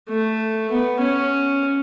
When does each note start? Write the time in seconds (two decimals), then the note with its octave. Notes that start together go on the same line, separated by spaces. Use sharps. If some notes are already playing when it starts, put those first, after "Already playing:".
0.09 A3
0.71 B3
1.00 C#4